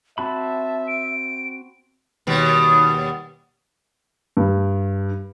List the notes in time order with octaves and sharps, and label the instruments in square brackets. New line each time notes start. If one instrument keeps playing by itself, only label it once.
[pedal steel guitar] C4 F#4 B5 [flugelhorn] E5 [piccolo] A5
[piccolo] D7
[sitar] D#2 B2 G3
[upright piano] G2